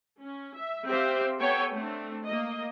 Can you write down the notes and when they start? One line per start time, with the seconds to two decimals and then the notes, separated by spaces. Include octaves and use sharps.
0.22 C#4
0.58 E5
0.88 C4 G4 C5 E5 F5
1.39 B3 A4 C#5 G5 G#5
1.73 A3 C4 D4
2.26 A#3 D#5